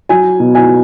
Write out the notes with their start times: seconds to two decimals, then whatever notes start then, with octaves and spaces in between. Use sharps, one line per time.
0.09 F#3 G#5
0.40 B2
0.55 G#5